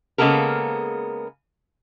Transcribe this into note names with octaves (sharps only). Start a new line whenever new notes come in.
C#3 G#3 A#3 B3 A4 A#4